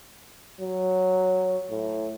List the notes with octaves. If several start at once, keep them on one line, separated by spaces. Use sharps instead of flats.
F#3
A2